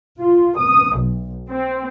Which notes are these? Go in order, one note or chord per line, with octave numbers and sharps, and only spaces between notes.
F4
D#6
B1
C4